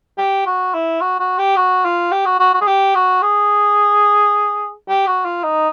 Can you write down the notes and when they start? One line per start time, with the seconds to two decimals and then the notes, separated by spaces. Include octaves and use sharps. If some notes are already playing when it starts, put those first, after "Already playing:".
0.18 G4
0.46 F#4
0.74 E4
1.01 F#4
1.20 F#4
1.38 G4
1.56 F#4
1.85 F4
2.12 G4
2.26 F#4
2.39 F#4
2.54 F#4
2.61 G#4
2.67 G4
2.95 F#4
3.22 G#4
4.89 G4
5.07 F#4
5.25 F4
5.44 D#4